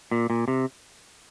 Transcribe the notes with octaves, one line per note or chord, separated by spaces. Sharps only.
A#2
A#2
C3